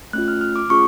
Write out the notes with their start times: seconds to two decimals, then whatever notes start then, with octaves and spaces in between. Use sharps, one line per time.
0.13 A3 C#4 F4 F#6
0.28 F6
0.41 F6
0.56 D6
0.69 A3 C#4 F4 G#4 C#6